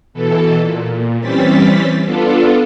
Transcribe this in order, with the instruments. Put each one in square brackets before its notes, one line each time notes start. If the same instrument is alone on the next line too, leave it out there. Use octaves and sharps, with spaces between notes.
[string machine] B2 E3 A4
A#2
E3 G3 C4 C#4 A6 B6
B3 D4 F4 A4